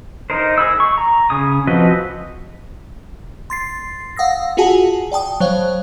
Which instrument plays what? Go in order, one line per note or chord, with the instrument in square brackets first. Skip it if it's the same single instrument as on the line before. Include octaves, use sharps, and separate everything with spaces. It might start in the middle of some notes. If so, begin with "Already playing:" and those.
[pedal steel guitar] D#4 A#4 C5
G#4 B5 E6
C#6
A#5
C#3 G#5 D#6
F3 C4 F#4 B4 D#5
[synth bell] C6 A6 C7
F5 F#5 D#6 E6 A#6
F4 F#4 G#4 F#5 G#5 A5
D5 G5 A5 D#6
F#3 C5 C#5 F5